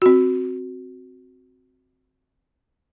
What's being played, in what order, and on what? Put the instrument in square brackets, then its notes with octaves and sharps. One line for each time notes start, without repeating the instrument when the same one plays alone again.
[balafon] C4 F#4